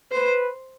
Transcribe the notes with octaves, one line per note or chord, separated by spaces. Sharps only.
B4 C5